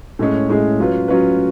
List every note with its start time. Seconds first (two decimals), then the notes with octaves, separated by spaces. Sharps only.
0.19 A2 G#3 C#4 G#4
0.49 A2 G#3 C#4 G#4
0.79 F#3 C#4 F4 B4
1.08 F#3 C#4 F4 B4